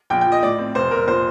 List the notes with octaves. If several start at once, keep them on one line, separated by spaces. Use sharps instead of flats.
A#1 G5
F3 G5
D#5
A2 D5
C4
F1 C5
F1 A#4
A#2 C5